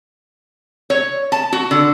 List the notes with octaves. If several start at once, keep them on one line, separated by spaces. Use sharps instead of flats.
C#5
A5
F#4
D3